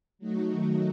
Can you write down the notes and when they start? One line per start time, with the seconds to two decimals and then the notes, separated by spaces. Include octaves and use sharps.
0.19 F#3 A3 D#4 F#4
0.50 D#3 F#3 A3 D#4 F#4